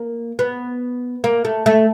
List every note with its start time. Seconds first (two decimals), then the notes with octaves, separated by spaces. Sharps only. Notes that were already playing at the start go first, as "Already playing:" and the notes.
Already playing: A#3
0.39 B3
1.24 A#3
1.45 A3
1.66 A3